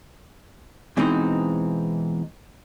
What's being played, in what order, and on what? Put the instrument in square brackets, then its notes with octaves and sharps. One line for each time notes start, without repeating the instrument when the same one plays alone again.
[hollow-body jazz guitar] B2 E3 G#3 C4 D#4